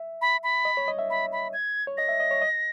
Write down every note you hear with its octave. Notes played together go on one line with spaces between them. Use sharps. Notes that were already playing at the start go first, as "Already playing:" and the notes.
Already playing: E5
B5
B5
D#5
C#5
D#5
E5
B5
B5
G#6
C#5
D#5 A#6
E5
D#5
C#5
D#5